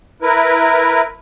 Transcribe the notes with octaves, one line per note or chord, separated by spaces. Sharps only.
E4 A#4 B4